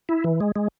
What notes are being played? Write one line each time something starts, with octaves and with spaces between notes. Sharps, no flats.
E4
E3
G#3
G#3